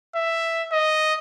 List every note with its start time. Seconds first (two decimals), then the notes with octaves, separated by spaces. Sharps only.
0.15 E5
0.72 D#5